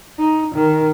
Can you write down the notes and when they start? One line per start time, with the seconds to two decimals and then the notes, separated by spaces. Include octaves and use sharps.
0.19 D#4
0.55 D#3